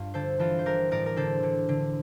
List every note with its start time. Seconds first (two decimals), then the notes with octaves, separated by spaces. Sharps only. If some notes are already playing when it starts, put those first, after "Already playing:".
Already playing: G2 F4
0.14 D3 A4 C5
0.39 E3 F4 A4
0.59 C5
0.65 E3 G4 A#4
0.91 A2 A#4 D5
1.06 A#4
1.16 D3 A4 C5
1.43 D3
1.69 D3